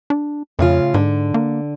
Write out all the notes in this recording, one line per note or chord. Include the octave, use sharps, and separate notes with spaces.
D4
F2 A2 C#3 F4
G#2 D3
A#3